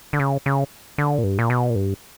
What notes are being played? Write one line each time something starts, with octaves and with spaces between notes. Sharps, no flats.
D3
C#3
C#3
D3
A#2
G2
A#2
B2
A#2
G2